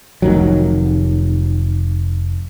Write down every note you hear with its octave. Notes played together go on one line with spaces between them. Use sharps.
F1 D#3 F#3